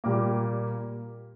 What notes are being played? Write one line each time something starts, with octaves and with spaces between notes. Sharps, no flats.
A#2 G3 A#3 D6